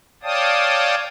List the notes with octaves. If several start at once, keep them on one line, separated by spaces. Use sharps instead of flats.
C#5 D5 F5 G5 A5 D#6